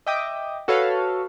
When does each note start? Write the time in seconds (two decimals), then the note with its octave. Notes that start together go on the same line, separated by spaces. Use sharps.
0.07 D#5 E5 G5 D6 D#6
0.68 F#4 A4 B4 C#5 F5